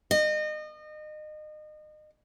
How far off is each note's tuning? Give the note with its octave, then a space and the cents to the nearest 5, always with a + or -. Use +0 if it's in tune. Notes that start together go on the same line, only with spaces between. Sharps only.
D#5 -30